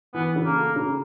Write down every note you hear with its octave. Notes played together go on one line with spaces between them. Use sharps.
E3 B3
C#3
A#3
A3
C#3